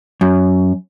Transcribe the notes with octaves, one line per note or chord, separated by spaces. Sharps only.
F#2